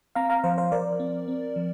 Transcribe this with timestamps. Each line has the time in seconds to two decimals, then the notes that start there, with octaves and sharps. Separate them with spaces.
0.15 C4 F5 A#5
0.30 F5 A#5
0.43 F3 C5 F5
0.58 C5 F5
0.72 F3 A#4 D5
1.00 C4
1.28 C4
1.56 F3